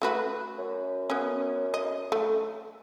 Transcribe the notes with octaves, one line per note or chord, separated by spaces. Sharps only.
A3 F#4 B4
F#2
B3 C#4
D#5
A3